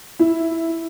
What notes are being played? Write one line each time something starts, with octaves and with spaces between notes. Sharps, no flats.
E4